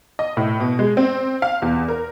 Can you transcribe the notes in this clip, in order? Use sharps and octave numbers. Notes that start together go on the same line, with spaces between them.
D#5
A2
B2
G#3
C4
F5
E2
A#4